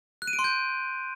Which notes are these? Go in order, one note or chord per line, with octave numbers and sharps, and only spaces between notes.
F#6
D#7
D7
C6
G6